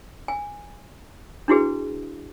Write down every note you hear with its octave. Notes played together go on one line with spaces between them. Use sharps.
G#5
D4 E4 F#4 G#4 B4